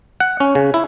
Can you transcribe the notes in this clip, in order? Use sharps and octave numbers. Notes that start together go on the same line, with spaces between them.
F#5
C#4
C#3
E4